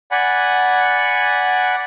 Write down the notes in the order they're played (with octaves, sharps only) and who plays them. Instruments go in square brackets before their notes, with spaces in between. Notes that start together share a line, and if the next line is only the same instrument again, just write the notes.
[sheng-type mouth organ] D5 F#5 G#5 B5